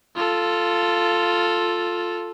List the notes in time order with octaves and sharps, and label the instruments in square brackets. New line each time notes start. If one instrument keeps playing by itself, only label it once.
[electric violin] F4 A4